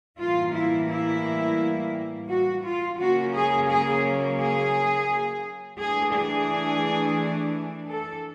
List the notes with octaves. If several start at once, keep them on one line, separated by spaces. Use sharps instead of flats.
A2 E3 G3 A#3 F4
E4
E4
F#4
F4
C#3 F#3 A#3 C#4 F#4
G#4
G#4
G#4
E3 A3 D4 G#4
G#4
A4